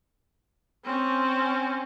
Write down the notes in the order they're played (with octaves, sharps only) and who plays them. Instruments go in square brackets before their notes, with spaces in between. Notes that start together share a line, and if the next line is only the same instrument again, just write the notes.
[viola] C4 C#4